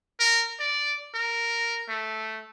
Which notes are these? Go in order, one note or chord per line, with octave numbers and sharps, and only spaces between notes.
A#4
D5
A#4
A3